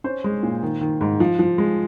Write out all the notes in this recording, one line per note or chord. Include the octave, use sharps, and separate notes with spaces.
C#4 C5
G#3
A#2
D#3
D#3
G#2
F3
F3
G#3